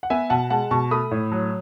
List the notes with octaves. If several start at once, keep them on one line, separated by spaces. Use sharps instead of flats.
F#5
B3 E5 G#5
B2 F#5 A5
G#3 F#5 A5
B2 A5 C#6
A3 B5 D#6
A2
F#3